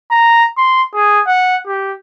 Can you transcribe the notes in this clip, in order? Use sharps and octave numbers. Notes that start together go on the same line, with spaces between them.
A#5
C6
G#4
F#5
G4